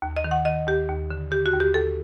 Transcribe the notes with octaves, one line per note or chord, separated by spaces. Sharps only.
D#2
D#5
D#3
F#5
D#3 D#5
D#2 G4
D#2
D3
D3 G4
F#4
D#2
G4
D#2 A4